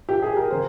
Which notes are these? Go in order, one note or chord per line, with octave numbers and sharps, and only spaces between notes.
G4
G#4
A#4
C#3 C5